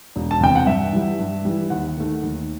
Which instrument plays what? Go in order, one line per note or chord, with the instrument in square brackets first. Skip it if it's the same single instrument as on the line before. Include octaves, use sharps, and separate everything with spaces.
[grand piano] E1
A5
E2 C3 G5
F#5
G2 E5
E3 G3
G2
E3 G3
D#2 F#5
D#3 A3
D#2